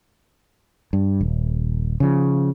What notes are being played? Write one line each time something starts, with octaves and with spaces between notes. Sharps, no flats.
G2
D#1
C#3 F3